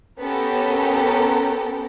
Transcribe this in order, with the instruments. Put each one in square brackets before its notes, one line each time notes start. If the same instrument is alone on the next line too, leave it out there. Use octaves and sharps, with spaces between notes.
[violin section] B3 C#4 G4 A4 A#4